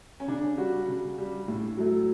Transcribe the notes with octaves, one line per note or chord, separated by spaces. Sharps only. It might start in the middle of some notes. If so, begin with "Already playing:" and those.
C#4
C#3 D4
G3 F#4
C#3
G3
A2
F#3 A3